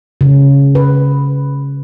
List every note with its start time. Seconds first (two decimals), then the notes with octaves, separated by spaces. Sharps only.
0.21 C#3
0.75 B4